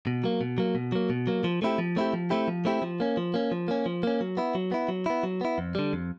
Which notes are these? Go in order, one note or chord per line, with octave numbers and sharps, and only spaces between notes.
B2
F#3 A#3
B2
F#3 A#3
B2
F#3 A#3
B2
F#3 A#3
F3
A3 C4 E4 G4
F3
A3 C4 E4 G4
F3
A3 C4 E4 G4
F3
A3 C4 E4 G4
F3
A#3 C#4
F3
A#3 C#4
F3
A#3 C#4
F3
A#3 C#4
F#3
B3 E4
F#3
B3 E4
F#3
B3 E4
F#3
B3 E4
F2
D3 G3
F2